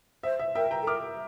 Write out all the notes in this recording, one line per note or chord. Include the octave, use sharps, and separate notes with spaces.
C5 E5
E5
A#4 E5 G5
G5 A#5
A4
A#4 D6 F6